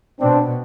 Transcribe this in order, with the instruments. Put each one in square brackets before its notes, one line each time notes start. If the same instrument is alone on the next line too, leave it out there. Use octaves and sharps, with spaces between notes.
[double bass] B2 [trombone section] C4 D4